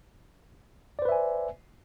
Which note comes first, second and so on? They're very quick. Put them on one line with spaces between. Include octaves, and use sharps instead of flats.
D5 C5 B4 E5 G#5